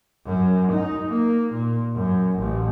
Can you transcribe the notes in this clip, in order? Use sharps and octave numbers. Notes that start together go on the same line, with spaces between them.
F#2
D#4
A#3
A#2
F#2
A1